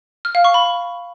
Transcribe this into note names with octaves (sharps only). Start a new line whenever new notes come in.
F6
F5
C#6
B5